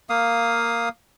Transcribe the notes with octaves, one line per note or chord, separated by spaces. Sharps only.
A#3 F5 D#6